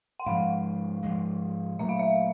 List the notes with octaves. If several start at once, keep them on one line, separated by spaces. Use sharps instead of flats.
F#5
G#2 F3 G#3 F5
G#2 F3 G#3
A#2 F#3 A3 E5
F5
E5